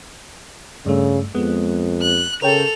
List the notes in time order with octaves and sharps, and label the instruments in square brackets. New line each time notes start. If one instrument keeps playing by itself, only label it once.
[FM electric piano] G2 A3 [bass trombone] C#3
[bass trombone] F2 [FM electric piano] G#3 B3
[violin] F#6
[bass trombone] C#3 [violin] A4 F7 [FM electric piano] A#4 C#5 G5